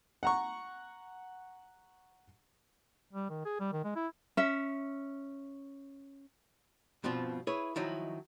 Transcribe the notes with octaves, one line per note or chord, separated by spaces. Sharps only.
F#5 A#5 C#6
G3
D#3
G#4
G3
D#3
G#3
E4
C#4 E5
G2 B2 F3 C4 F4
E4 G#4 B4 C#5
D#3 F3 F#3 D#4 E4 F#4